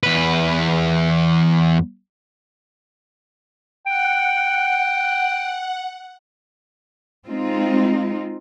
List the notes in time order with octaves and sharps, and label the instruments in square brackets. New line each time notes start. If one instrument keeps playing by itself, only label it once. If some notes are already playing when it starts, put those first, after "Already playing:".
[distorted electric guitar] E2 B4
[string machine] F#5 [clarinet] G5
[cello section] G#3 C4 D#4 F4